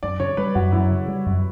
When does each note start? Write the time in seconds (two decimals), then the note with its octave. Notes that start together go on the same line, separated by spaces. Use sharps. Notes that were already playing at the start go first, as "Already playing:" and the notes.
0.03 F#2 D5
0.20 C#3 C#5
0.37 G3 B4
0.55 F#2 F#4
0.72 F#2 E4
0.91 C#3
1.08 G3
1.26 F#2